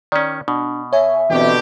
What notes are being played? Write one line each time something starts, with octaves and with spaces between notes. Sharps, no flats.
D#3 C#4 D5
B2 D4
C#5 E5 G#5
B2 D3 E3 C4 G4